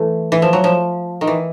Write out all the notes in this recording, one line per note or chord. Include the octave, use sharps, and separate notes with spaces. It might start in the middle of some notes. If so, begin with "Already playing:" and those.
Already playing: E3 A3
E3
F3
F#3
F3
D#3
E3